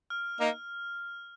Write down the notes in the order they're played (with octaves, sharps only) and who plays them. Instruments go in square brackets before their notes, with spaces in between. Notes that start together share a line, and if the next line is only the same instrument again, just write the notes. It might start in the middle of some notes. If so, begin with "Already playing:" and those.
[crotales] F6
[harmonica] A#3 D#4